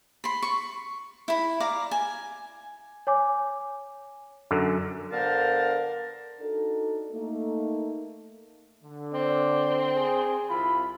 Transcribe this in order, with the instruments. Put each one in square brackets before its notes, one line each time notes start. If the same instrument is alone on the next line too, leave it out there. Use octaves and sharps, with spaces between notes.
[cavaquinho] B5 C6
C#6
E4 B5
D5 F5 A#5 D6
G#5
[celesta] C#5 G#5 D6
[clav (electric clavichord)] F#2 D3
[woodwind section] D3 B3 A#4 C5 F5 A5
[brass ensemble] D4 D#4 F#4 A4
A3 A#3 D#4
[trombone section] D3
[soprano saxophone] C4 [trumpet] D5
[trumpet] G#4
[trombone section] C2 E4 F4 [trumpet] B5